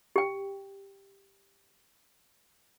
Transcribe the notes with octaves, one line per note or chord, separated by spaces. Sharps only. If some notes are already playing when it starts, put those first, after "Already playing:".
G4 G5